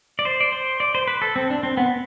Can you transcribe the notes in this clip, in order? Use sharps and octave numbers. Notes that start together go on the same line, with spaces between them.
D5
C5
D5
C5
D5
C5
B4
A4
C4
D4
C4
B3